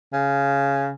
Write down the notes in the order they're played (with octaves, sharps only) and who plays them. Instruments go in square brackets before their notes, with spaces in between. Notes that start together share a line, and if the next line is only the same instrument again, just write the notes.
[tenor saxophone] C#3